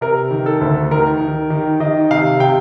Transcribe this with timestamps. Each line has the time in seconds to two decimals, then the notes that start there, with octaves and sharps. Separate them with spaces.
0.01 C3 A#4
0.31 D#3
0.46 A4
0.61 D2
0.91 D#3 A#4
1.21 D#3
1.50 D#3
1.80 D#3 D#5
2.10 C3 F5
2.40 C3 G5